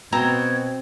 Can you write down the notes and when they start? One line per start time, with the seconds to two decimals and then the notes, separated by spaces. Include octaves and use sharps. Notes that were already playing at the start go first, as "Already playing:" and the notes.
0.13 B2 C4 A#5 G#6